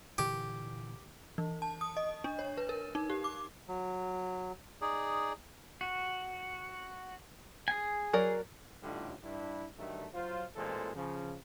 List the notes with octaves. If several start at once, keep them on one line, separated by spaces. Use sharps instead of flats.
A#2 D3 E3 G4
E3
A5
D#6
D#5
D4
C#5
B4
A#4
D#4
G4
D6
F#3
D#4 G#4 D5
F#4
G#4 G#5
F#3 A#4 D5
A1 A2 D3 G3 D#4 F4
G2 D4 E4
G2 D#3 F#3 A3
F#3 F4 C5
A1 A#2 E3 G#3 A4 C5
C#3 F3